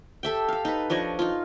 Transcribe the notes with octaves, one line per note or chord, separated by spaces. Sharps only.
G4 A4 E5 G5
A4 F5
D#4 B4
F3 D4 C#5 D#5
D#4 F4